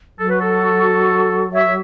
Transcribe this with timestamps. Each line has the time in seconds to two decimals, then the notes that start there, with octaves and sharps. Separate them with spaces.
0.19 F#3 A4
0.29 B4
0.40 F#4 A4
1.53 C#5 E5